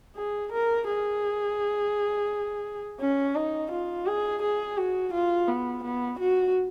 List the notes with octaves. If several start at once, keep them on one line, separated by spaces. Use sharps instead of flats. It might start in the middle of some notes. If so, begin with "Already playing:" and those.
G#4
A#4
G#4
C#4
D#4
F4
G#4
G#4
F#4
F4
B3
B3
F#4